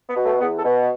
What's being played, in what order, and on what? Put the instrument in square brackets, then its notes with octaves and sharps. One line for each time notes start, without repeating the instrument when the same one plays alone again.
[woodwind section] B3
B2
A3
E2 B3
A4
B2